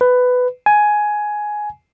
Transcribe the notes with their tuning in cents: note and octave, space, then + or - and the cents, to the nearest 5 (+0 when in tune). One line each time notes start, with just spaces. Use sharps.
B4 +15
G#5 +10